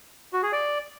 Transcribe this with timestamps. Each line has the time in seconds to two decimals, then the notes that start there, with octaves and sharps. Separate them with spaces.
0.33 F#4
0.43 G#4
0.52 D5